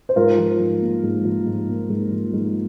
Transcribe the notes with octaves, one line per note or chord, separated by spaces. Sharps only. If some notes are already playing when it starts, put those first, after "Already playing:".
C5
G#2 F4 A#4
F3
G#2
A#3
G#2
F3
G#2
A#3
G#2
F3
G#2